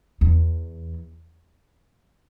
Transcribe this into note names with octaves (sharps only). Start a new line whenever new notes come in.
E2